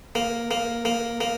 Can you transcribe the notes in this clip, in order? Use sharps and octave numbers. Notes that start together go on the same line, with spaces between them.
A#3
A#3
A#3
A#3